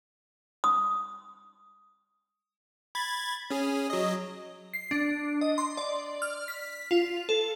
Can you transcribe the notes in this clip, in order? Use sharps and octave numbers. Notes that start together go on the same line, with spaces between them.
D#6
B5 G#6 A6
C#4 G#4
F#3 D#5
C7
D4
D#5
C6
D5
F6
B6
F4
A4